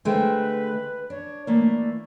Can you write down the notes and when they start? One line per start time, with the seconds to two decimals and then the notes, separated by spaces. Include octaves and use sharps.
0.05 D3 G#3 A3 B4 C5 G5 G#5
1.10 D4 C#5
1.47 E3 A3 A#3 D5